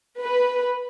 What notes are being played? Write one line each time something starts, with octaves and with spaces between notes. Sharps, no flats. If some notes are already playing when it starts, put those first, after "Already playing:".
B4